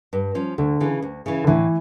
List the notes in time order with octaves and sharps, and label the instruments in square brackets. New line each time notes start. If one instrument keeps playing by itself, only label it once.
[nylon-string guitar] G2
F3 C#4
[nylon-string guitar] D2 [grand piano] D3
[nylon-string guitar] C#3 E3
D2
C#3 E3
[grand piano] D3
[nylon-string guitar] A2 [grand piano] E3